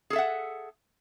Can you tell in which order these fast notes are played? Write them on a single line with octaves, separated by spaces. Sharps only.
G#4 A4 E5 F#5